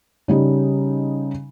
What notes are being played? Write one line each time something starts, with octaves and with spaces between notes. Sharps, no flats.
C#3 G3 D#4